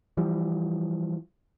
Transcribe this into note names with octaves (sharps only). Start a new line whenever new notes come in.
E3 F3 G3